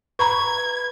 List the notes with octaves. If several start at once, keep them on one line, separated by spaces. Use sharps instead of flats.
B4 A#5 B5 C#6 G#6